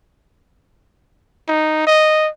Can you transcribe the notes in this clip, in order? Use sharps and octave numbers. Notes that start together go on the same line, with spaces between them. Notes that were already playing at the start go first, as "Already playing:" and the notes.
D#4
D#5